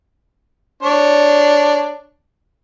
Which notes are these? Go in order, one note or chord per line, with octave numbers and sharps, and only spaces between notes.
D4 C#5